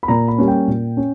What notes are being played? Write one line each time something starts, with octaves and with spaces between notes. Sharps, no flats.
B5
A#2 A#5
B5
G3 A#3 C#4
G5
A#2
C#4